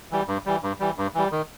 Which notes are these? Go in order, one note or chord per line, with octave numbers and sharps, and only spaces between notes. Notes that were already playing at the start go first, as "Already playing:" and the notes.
E3 G3
G2
E3 G3
G2
E3 G3
G2
E3 G3
D#3